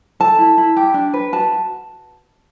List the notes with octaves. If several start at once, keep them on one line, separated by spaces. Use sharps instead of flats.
A4 A5
E4
E4
G4
D4
B4
F#4 A5